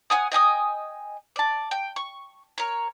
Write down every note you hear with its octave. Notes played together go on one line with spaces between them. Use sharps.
C#5 F#5 G#5 D#6
D#5 G5 G#5 D#6
D5 A5
G5
C#6
A#4 C#5